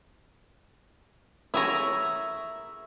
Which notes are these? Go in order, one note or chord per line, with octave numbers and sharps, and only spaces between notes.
E4 G#4 E5 A#5 C#6